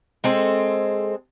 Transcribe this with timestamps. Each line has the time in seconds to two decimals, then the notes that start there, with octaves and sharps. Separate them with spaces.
0.24 G#3 C4 A4